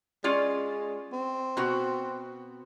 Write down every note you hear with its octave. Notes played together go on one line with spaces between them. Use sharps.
G#3 C#4 F4 D5
C4
B2 F#4